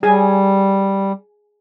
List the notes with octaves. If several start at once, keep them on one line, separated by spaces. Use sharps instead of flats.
G3 G#4 G#5